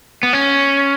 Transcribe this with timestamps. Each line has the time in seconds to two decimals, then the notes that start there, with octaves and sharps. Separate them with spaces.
0.23 B3
0.33 C#4